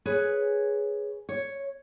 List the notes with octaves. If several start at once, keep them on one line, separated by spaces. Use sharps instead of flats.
G#4 B4 C#5
C#5